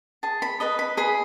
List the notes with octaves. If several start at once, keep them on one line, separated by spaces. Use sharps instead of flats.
G#4 A5
B5
B4 D#5 B5
B5
G#4 B5